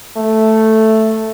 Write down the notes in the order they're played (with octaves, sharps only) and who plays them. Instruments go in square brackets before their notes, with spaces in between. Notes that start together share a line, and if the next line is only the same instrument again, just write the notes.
[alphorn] A3